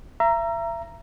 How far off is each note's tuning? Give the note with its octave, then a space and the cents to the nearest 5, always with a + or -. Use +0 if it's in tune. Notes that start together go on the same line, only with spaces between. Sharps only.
E5 +35 A#5 +0